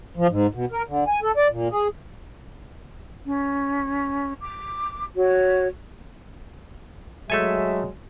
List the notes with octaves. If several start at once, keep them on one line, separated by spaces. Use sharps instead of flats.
F3
G#2
B2
A#4
D3
G#5
A4
D5
A#2
G#4
C#4
D6
F#4 C#5
F#3 G#3 A3 A4 E5 G#5